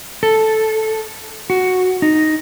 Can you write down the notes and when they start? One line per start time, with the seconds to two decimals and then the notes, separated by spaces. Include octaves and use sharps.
0.23 A4
1.50 F#4
2.02 D#4